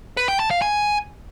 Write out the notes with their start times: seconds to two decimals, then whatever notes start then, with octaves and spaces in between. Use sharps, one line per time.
0.17 B4
0.28 G5
0.39 A5
0.51 F5
0.62 G#5